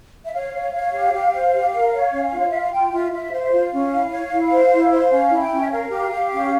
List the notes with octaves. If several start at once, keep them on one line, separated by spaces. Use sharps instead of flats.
E5
C#5 F5
C#5
C#5
G4
G4
C5
G4
A#4
C#5
C#4
F4
C#5
F4 E5
F5
F4 G5
F4 E5
F4 E5
C5 F5
E5
F4 F5
C#4
E4
C#5
E4
C5
E4
C5
C#4 F5
E4
G5
C#4
E5
A#4 F5
G4
G4
C#4